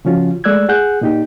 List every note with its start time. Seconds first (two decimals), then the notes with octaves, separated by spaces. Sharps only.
0.05 C#3 F3 C#4 F4 F#4
0.44 G#3 A3 D5 E6 F#6 G#6
0.69 G#4 F#5 F#6 G6
1.01 A#2 D#4 G4